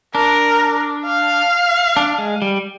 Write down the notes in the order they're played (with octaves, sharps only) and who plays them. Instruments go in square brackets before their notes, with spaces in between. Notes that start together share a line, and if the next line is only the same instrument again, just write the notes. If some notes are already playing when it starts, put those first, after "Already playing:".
[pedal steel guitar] D4 [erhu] A#4
[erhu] F5
[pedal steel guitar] D4
G#3
G3